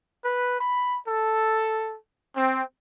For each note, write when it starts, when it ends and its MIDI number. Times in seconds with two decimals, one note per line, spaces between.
0.24 0.59 71
0.61 0.97 83
1.08 1.97 69
2.35 2.64 60